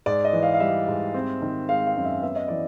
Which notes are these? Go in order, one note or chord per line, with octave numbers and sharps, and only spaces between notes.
G#2 D5
D#5
E3
F5
F5
G3 E5
G#2
C4
D#3
G#3 F5
F5
F#2
E5
B3 E5
D#5
E3 D5